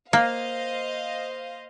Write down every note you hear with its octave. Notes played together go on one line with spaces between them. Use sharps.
A#3 C5 D#5 F5